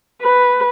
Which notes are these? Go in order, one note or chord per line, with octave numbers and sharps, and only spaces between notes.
B4